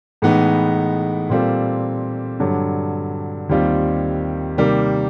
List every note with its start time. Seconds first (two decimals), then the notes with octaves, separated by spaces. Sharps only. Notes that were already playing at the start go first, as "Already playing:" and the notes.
0.22 A2 E3 G#3 B3 D#4
1.30 A#2 G3 C4 F4 A4
2.40 G2 D3 F#3
3.49 D#2 D#3 G3 C4 F4
4.58 C3 D#3 G3 A#3